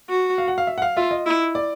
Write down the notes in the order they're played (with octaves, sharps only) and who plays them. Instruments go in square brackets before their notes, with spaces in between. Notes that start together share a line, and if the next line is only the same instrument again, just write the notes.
[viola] F#4
[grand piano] F5
F#5
F5
E5
F#5
F5
[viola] F4 [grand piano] E5
[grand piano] D#5
[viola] E4
[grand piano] D5